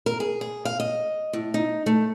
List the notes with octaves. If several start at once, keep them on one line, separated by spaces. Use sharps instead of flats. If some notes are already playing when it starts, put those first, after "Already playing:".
A#4
G#4
G#4
F5
D#5
A2
D#4
A3